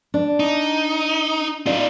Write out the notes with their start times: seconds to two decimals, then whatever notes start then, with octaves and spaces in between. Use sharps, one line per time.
0.14 D4
0.40 D#4
1.66 D#4 F4 D5